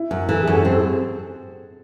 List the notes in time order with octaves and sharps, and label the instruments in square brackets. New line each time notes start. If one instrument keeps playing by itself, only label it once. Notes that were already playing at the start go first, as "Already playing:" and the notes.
Already playing: [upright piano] E4
[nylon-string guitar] F#2
[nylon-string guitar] E3 [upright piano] A4
[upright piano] G#4
[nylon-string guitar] F#2
[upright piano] A4
[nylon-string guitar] C4 [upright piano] G#4
[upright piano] A4